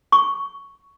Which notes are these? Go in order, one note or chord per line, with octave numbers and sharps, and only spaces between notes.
C#6